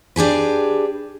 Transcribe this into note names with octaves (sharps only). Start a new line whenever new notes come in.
D4 G4 G#4 B4